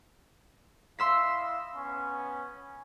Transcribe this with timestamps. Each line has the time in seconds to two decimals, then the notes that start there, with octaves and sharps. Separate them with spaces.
0.99 E4 D#5 F5 C6 E6 B6
1.75 B3 C#4